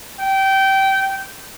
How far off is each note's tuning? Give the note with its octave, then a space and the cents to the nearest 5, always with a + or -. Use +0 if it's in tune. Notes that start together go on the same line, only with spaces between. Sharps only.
G5 -20